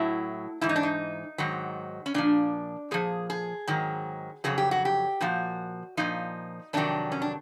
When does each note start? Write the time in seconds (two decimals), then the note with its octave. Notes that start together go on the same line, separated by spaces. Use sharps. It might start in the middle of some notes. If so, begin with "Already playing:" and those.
Already playing: A2 F#3 E4
0.61 G#2 E3 E4
0.69 D#4
0.76 D4
0.83 D#4
1.38 G#2 D#3 F#3
2.06 C#4
2.14 A#2 F3 D4
2.91 A#2 F3 G#4
3.30 G#4
3.67 G#2 D#3 F#3
4.44 F2 C#3 F#3 G#4
4.58 G4
4.71 F#4
4.85 G4
5.21 A#2 F3 F#4
5.97 A#2 F3 D#4
6.73 F2 C3 D#3 F#3 D4
7.12 C#4
7.22 D4